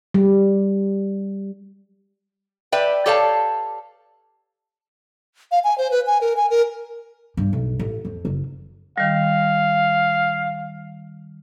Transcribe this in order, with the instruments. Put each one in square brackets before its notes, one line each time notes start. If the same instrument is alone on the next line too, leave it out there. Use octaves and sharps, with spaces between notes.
[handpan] G3
[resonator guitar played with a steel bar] B4 D5 E5 G5
G4 A4 C#5 D5 F5 A5
[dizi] F5
G#5
C5
B4
G#5
A#4
G#5
A#4
[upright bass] G2
B1
A1
F2
F#1
[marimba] D#3 G3 [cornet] F5